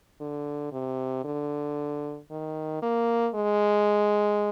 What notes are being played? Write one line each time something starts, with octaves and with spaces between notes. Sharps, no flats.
D3
C3
D3
D#3
A#3
G#3